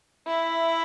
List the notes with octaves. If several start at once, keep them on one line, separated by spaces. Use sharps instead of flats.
E4 E5